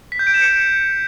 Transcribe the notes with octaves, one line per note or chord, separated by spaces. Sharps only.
B6
G6
D7
E7
C#7